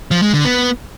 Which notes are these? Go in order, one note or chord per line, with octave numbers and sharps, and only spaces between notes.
F3
G#3
D3
B3